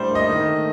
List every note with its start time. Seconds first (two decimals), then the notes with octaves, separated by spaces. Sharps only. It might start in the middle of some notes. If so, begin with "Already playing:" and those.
Already playing: A2 G3 D4 C5
0.10 A#3
0.15 D#5
0.29 D#3
0.47 A3